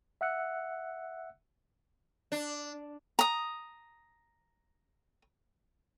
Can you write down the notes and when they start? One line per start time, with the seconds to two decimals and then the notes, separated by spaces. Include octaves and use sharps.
0.21 E5 F#5 E6 F#6 C#7
2.32 D4
3.19 A#5 D#6